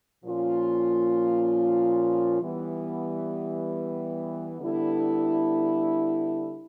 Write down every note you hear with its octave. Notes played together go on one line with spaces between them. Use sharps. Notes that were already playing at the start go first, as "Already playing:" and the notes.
A#2 F3 A#3 C#4 F4
E3 G3 B3
D3 G3 B3 E4 A4